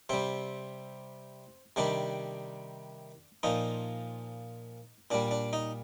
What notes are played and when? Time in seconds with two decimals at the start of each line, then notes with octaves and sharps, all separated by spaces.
0.09 C3 G3 C4
1.76 C3 D#3 G3 D4
3.43 A#2 F3 D#4
5.11 A#2 G3 D4
5.31 D4
5.53 D#4